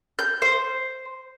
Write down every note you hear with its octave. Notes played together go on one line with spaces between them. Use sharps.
G6
C5